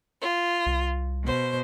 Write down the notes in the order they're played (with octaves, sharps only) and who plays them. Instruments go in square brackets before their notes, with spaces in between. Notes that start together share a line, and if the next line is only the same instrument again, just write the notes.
[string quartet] F4
[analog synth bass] C2
[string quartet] B2 C5